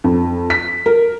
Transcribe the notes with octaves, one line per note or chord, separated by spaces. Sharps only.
F2
B6
A#4